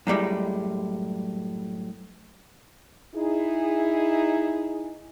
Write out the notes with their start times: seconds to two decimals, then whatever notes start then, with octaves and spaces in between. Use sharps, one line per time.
0.07 F#2 A2 G3 G#3
3.15 D#4 E4 G#4